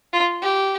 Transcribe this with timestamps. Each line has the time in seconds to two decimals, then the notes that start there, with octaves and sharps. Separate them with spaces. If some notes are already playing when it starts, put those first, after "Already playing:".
0.13 F4
0.42 G4